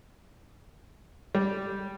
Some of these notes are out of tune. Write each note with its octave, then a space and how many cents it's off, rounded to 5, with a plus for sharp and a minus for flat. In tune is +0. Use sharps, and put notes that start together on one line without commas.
G3 -5